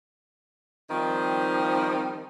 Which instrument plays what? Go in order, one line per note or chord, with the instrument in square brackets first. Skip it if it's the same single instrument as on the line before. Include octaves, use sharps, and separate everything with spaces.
[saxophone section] D#3 F3 G3 C4 D#4